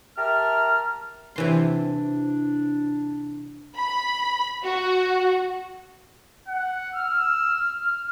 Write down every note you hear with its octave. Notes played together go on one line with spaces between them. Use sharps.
G4 A#4 E5 A5 A#5 F6
C3 E3 D4 C6
B5
F#4
F#5
E6 F6